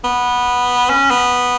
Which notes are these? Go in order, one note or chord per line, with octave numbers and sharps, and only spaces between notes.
B3
C#4
B3